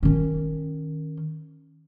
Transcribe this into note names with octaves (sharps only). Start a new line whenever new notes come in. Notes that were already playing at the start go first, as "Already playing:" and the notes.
D#3 C#4